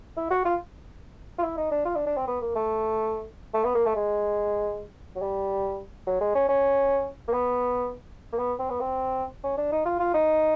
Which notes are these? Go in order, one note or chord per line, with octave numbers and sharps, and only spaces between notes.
E4
F#4
F4
F4
E4
D#4
D4
F4
D4
D4
C4
B3
A#3
A3
A3
B3
A#3
A3
G#3
F#3
G3
F#3
G#3
C#4
C#4
A#3
B3
A#3
B3
C4
B3
C4
C#4
D4
D#4
F4
F4
D#4